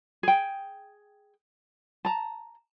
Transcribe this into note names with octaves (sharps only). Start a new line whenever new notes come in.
G#4 G5
A5 A#5